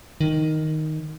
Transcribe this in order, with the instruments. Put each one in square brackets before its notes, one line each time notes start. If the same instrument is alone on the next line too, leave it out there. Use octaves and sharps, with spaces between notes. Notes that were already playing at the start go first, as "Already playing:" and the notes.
[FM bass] D#3